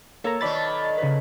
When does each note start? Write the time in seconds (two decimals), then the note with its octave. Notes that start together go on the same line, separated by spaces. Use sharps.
0.24 A#3 A4 C#5 A#5
0.41 B2 D#3 F#3 D5 B5 A6
0.98 C#3 B4